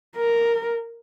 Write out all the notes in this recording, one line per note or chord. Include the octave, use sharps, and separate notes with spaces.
A#4